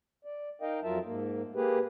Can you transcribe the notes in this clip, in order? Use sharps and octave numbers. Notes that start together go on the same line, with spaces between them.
D5
D#4 A#4 D#5 F5 G5
F2 F#3 F4 A#4 E5 A5
G#2 A#3
A#3 G4 G#4 B4